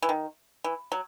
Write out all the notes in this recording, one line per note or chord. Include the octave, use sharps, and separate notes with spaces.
E3
D#3
E3
F#3